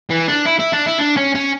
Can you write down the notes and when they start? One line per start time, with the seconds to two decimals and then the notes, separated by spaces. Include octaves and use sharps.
0.10 E3
0.28 D4
0.45 E4
0.59 E4
0.73 D4
0.86 E4
0.99 D4
1.17 C#4
1.35 C#4